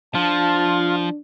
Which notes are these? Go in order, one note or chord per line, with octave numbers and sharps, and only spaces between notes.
F3 D4 F4 A5